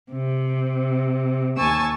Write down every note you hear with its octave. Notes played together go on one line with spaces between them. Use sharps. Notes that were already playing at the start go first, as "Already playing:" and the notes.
C3
D#2 G#5 A5 C#6 E6